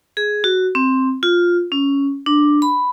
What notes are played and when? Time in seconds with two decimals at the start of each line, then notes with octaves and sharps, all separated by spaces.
0.17 G#4
0.44 F#4
0.75 C4
1.23 F4
1.72 C#4
2.26 D4
2.62 B5